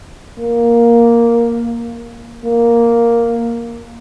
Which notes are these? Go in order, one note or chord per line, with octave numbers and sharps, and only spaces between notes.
A#3
A#3